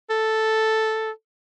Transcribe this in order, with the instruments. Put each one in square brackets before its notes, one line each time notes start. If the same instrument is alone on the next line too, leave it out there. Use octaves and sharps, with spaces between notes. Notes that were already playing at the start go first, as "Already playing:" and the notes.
[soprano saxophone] A4